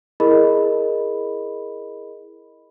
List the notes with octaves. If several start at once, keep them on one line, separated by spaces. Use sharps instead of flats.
E4 G#4 A#4 D#5 B5